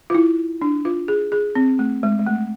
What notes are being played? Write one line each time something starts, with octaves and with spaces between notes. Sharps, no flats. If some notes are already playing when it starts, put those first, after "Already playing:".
F4
E4
D4
F4
G#4
G#4
C4
A3
G#3
G#3
A3